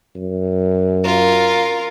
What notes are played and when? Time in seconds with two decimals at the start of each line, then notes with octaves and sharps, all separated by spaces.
0.16 F#2
1.05 F4 A#4